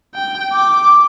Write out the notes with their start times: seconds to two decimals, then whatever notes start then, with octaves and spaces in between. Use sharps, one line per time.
0.15 G5
0.53 D6